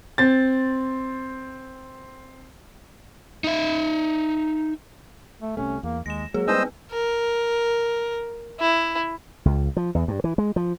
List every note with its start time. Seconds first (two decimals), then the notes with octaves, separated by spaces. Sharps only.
0.18 C4 A6
3.44 D#4 E5
5.42 A3
5.57 C2 C3 A3 C#4
5.83 E2 A#3
6.06 D#2 G#3 A#6 E7
6.34 F#3 G#3 A#3 G#4
6.48 G3 B3 C4 B4 C5 D#5 E6
6.92 A#4
8.60 E4
9.45 C#2
9.77 F3
9.95 E2
10.08 G2
10.24 E3
10.38 G#3
10.56 F3